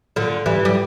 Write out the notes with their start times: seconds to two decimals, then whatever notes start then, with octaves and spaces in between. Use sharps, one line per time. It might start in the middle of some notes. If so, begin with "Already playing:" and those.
0.16 A#2 D3
0.46 E3 G3
0.65 G3